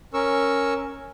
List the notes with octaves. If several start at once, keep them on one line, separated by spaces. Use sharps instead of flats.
C#4 A#4 C#6 E6